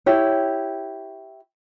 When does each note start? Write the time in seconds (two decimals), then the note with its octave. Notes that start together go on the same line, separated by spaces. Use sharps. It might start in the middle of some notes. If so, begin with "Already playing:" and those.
0.06 E4 G4 C#5